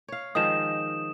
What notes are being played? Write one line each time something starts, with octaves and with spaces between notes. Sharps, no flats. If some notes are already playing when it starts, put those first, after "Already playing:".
C#5 F5
D#3 F3 G#3 D#6 E7